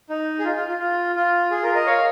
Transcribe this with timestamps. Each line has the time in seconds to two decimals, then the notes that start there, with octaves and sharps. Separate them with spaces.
0.10 D#4
0.39 G#4
0.44 F4
0.55 F4
0.68 F4
0.79 F4
1.16 F4
1.51 G#4
1.63 F4 A#4
1.74 A#4 D#5
1.86 C#5 F5